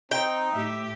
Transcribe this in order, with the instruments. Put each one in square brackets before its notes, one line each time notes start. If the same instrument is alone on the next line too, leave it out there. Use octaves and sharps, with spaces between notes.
[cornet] C4 [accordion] D#4 [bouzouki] G5
[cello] A2 G4 [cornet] E5